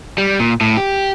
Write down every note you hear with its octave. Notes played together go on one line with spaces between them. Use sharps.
G3
A#2
A2
G4